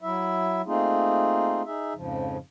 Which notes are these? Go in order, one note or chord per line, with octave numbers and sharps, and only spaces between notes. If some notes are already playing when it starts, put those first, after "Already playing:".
F#3 E4 E5
A3 A#3 C4 D#4 F4 G#4
D#4 G#4 E5
F2 G#2 C#3 F3